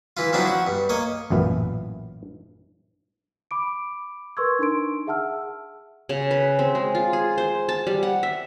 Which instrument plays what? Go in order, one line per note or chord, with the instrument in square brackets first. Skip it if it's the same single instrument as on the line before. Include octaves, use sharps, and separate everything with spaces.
[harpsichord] E3 E4 F4
F3 F#3 C4 D4 E4
F#4
G2
A#3 C#5 D#5
[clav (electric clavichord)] A1 F#2 A#2 B3 E5 F5
[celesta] B5 D6 D7
A#4 B4 C6 C#6 E6 G#6
D4 D#4 A#4 C6 D7
G#4 E5 F#5 A5 E6 F6
[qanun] C#3
B4
C4
G#3
F4
G#4
C5
A5
G3
F#5
E5